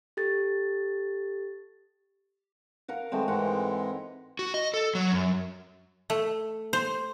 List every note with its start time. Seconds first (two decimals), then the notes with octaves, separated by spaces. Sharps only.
0.17 G4 A4 A6
2.88 A#4 F5 F#5
3.12 D#3 G#3 A3 B3 C4
3.28 G#2 E3 G#3 A#4 F#5
4.39 F#4
4.54 D#5
4.74 A4
4.95 F#3
5.11 F#2
6.10 A3
6.73 C5